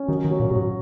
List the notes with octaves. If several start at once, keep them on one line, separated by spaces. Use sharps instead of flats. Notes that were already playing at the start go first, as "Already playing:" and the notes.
Already playing: C#4
D#3 F#3
D#3
F#3
A#2
A#2 F#3
G#2